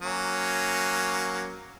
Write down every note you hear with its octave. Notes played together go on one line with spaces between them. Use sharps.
F#3 A#3 C#4